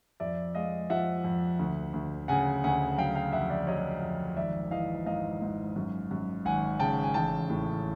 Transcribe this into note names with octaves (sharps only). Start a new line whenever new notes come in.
F2 D5 E5
G#3 D#5 F5
F3 E5 F#5
F2
D2
D2
C#3 F#5 G#5
D2 F#5 G#5
F#3 F5 G5
F5 G5
F2 E5 F#5
D5 E5
F#3 C#5 D#5
F2
G#1 D5 E5
E3 D#5 F5
G#2 D#5 F5
G#2
F#2
F#2
G#1 F#5 G#5
C#3 G5 A5
G#5
A1 G5 A5
A2